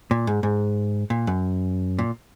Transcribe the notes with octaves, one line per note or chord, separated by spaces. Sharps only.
A#2
G#2
G#2
A#2
F#2
A#2